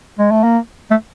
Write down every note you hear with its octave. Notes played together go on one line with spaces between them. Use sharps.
G#3
A3
A#3
A3